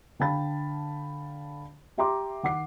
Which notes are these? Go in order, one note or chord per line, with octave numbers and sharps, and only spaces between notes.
D3 F5 G5 A5 B5 A6
G4 E5 G5 A#5 C6 D6
D#3 F#5 D6 C7